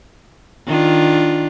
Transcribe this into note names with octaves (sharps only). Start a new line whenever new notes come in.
D#3 D4 F4